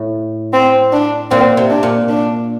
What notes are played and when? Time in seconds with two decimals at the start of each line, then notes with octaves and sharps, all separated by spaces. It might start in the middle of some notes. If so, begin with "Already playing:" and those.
Already playing: A2
0.53 C4
0.92 D4
1.31 A#2 C4
1.57 C3
1.70 D4
1.83 A#2
2.09 D4